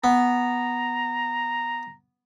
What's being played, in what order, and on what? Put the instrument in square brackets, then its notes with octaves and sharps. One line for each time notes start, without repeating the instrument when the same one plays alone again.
[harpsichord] B3 [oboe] A#5